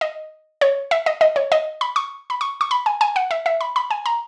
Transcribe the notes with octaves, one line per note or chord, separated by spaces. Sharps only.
D#5
C#5
E5
D#5
D#5
C#5
D#5
B5
C#6
B5
C#6
C#6
B5
G#5
G#5
F#5
E5
E5
B5
B5
G#5
A#5